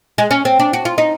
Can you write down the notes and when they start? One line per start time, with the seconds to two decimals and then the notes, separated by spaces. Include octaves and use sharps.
0.18 G#3
0.31 C#4
0.45 C4
0.59 D4
0.73 F#4
0.85 F4
0.98 D#4